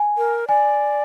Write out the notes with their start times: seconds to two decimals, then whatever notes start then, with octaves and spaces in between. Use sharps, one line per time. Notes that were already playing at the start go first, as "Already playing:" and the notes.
Already playing: G#5
0.18 A#4
0.48 D5 G#5